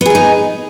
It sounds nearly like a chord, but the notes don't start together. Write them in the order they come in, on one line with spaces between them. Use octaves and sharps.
B3 G#4 A#4 D#4